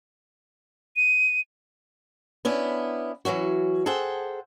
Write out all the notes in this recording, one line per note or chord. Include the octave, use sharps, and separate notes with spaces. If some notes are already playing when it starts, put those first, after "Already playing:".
D#7
B3 C#4 D4 E4
E3 F#3 C#4 F#4
G#4 A4 C5 F#5 G5